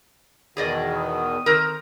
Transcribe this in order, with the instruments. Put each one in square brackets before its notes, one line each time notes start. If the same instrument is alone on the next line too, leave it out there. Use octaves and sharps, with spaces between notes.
[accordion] E2 B2 D#3 [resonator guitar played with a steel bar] G#4 D5 D#5
[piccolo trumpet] D#6
[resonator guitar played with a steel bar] D#3 C4 A#4